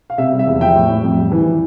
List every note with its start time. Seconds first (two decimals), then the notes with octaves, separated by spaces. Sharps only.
0.10 F5
0.18 C3 E5
0.32 G3
0.39 E5
0.47 E2
0.61 F3 E5 G5
0.75 A2
0.89 A2
1.03 F2
1.17 G3
1.32 E3